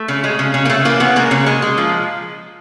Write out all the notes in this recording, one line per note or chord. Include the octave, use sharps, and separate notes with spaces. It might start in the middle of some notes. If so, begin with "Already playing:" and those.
Already playing: A3
C#3
G#3
C#3
C#3
A#3
C#3 A3
E3 A#3
C#3 B3
G#3 A#3
C#3
G#3
G#3
F3